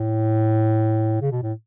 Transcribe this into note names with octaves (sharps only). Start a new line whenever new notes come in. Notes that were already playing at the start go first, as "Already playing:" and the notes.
Already playing: A2
C#3
B2
A2